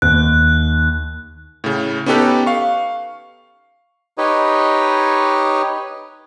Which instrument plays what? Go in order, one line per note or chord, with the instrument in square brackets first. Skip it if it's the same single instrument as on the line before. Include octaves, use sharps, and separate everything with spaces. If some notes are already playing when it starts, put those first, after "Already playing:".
[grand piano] D#2 [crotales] F#6
[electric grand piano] A2 C#3
B3 C#4 D#4 G4 A4 B4
F5 C#6
[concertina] D#4 G4 B4 C#5 D#5